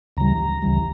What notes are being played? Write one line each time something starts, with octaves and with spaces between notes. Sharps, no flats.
D2 C#3 E3 G3 A#5
D2 C#3 E3 G3